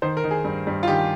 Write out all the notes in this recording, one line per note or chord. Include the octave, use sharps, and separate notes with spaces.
D#3 C5
A#4
D#3
G#4
G2
G2
F4
D#3 G4